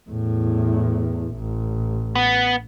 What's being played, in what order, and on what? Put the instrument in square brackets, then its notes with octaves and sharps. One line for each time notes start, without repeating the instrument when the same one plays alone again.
[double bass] E2 A2
A1
[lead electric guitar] B3